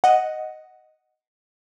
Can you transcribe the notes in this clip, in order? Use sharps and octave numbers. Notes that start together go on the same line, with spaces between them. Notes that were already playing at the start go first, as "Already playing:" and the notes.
D#5 F#5